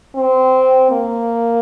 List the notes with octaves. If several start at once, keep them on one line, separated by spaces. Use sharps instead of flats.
C4
A#3